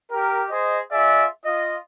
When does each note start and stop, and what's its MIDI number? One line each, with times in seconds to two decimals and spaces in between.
0.12 0.44 67
0.12 0.44 70
0.50 0.79 68
0.50 0.79 72
0.50 0.79 75
0.92 1.26 65
0.92 1.26 68
0.92 1.26 74
0.92 1.26 76
1.45 1.77 65
1.45 1.77 75